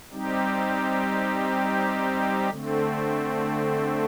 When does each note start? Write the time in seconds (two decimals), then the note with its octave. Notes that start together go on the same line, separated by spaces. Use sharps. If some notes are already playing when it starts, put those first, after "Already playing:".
0.12 G3 C4 D#4 G4
2.50 D3 A3 C4